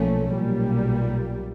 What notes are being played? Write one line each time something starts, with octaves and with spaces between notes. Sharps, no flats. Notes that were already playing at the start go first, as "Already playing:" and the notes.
Already playing: B1 A#2 F3 A3 C#4
B1 A#2 G3